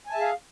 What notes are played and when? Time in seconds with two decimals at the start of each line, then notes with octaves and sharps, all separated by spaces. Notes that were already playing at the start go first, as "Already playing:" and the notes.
0.07 G#5
0.10 A5
0.14 E5
0.17 G#4
0.21 F5